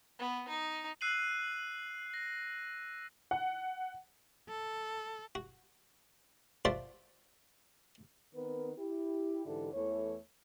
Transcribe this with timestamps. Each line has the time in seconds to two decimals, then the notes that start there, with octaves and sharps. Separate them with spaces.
0.19 B3
0.48 D#4
1.01 E6 F#6 C7 D#7 F#7
2.14 A#6
3.31 F#5
4.49 A4
5.35 F#4
6.65 F4 F#4 A4 C5 D5 E5
8.35 D#3 B3 C4 A#4 B4
8.78 E4 G4
9.45 G#2 D3 E3 E4 G4 A4
9.74 E2 E3 A3 A4 C#5